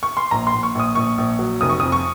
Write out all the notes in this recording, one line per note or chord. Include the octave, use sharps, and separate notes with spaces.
C#6
C6
A#1 A#5
C6
A#1
C#6
A#1 D#6
A#1 C#6
A#1
F#3
F1 D#6
C#6
F2 D#6
C#6